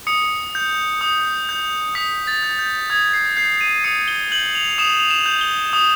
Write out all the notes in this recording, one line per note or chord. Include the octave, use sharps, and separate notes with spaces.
D#6 C#7
G6
D#6
G6
D#6 B6
A6
G6
G6
D#6 G#6
C7
G6 C7
D#7
D#6 C#7
G7
G6 F#7
F7
D#6 E7
F7
E7
G6
G7
D#6